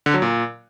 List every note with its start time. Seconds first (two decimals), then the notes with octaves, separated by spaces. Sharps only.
0.06 D3
0.14 F#3
0.22 A#2